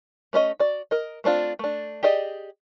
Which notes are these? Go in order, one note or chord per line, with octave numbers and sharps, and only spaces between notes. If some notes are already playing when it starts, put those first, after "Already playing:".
A3 C#4 B4 D#5
F#4 D5
A#4 D#5
A3 C4 D4 F4
A3 D4
G4 G#4 D5 D#5